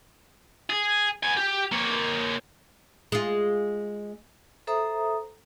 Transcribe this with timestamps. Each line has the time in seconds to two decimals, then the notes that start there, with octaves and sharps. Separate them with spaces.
0.70 G#4
1.23 B3 G#5
1.37 G4
1.72 A#3 C#5
3.12 G#3 F4
4.67 A4 C5 E5 A#5 D#6